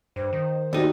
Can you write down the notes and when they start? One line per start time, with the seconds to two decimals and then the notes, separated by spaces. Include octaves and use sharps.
0.16 G2 C5
0.33 D#3
0.73 D#2 D#4 F#4 A4 D5